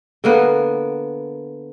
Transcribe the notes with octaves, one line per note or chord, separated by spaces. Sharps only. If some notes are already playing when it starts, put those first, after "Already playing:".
D3 A#3 B3